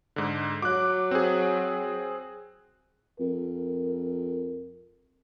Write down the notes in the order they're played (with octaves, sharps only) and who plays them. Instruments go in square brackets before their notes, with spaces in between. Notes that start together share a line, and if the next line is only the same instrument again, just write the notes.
[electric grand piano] G#2 D3
[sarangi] F#3 [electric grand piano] D6 F#6
[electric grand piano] C4 G#4
[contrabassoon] F2 [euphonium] A#4